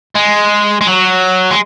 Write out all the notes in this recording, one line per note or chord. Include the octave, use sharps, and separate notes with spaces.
G#3
G#3
F#3
G#3